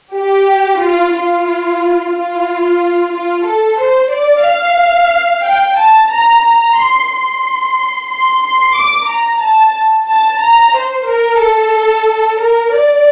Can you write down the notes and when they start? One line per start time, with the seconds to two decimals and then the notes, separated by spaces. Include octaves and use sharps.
0.15 G4
0.81 F4
1.15 F4
2.14 F4
3.12 F4
3.46 A4
3.79 C5
4.11 D5
4.45 F5
5.44 G5
5.77 A5
6.11 A#5
6.44 A#5
6.77 C6
7.09 C6
8.10 C6
8.42 C6
8.75 D6
9.08 A#5
9.41 A5
10.08 A5
10.41 A#5
10.74 C5
11.06 A#4
11.40 A4
12.39 A#4
12.73 D5